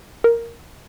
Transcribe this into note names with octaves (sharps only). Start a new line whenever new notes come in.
A#4